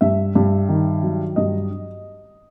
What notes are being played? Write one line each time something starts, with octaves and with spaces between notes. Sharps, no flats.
G2 E5
G2
D#3
F#3
G2 D#5